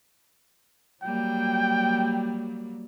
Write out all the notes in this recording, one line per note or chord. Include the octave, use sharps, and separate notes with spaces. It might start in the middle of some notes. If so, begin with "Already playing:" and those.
F#3 G3 A#3 G5